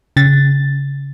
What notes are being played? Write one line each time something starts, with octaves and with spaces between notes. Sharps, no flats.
C#3 A6